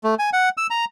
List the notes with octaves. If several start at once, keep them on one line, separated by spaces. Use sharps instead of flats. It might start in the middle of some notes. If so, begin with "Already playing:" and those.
A3
G#5
F#5
E6
A#5